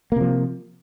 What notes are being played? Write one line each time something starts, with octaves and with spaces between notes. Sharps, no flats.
C3 F3 A#3